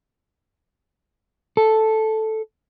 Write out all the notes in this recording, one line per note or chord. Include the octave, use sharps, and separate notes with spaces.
A4